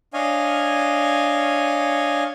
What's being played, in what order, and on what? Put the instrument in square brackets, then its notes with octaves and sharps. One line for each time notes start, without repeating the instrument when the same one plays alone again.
[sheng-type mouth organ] D4 C#5 D#5 F5 G#5